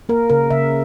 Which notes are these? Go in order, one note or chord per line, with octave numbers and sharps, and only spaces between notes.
A#3 A#4
C#3 A#4
C#3 E5